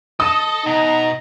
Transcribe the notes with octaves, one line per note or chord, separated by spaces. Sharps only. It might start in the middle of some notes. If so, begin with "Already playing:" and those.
A4 D#5 A5 D#6
B2 D#4 A#5